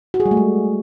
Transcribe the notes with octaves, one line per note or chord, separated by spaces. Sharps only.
F#4
G#4
G3
A3
G#3